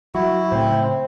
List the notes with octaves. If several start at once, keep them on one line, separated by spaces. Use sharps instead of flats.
F#3 E4 F#4
A2 C#3 A3 C4 C5